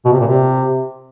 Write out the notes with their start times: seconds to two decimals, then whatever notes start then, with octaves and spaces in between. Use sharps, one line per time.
0.05 B2
0.13 C3
0.20 A#2
0.28 C3